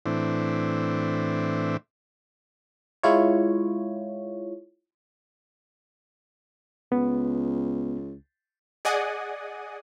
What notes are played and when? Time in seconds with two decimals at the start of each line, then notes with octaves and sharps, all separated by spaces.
0.06 A2 E3 C4 D4
3.03 G#3 E4 F4 C#5
6.92 C#2 B3
8.85 G#4 D5 D#5 F#5 G#5 D#6